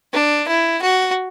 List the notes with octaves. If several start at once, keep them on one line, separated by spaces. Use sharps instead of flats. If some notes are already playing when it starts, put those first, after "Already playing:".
D4
E4
F#4